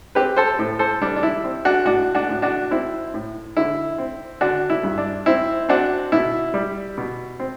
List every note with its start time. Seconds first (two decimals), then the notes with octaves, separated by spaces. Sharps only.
0.15 C4 G4 B4
0.36 A4 C5
0.59 A2
0.79 A4 C5
1.01 G3 D4
1.16 D4
1.23 E4
1.44 C4
1.65 D4 F#4
1.85 A2 D4 F#4
2.15 D4 F#4
2.29 A2
2.42 D4 F#4
2.71 C4 E4
3.14 A2
3.57 D3 E4
3.98 C4
4.41 D3 D4 F#4
4.70 E4
4.83 G2
4.98 D4
5.26 C4 E4
5.69 C4 D4 F#4
6.12 B2 E4
6.54 G3
6.97 B2
7.40 C4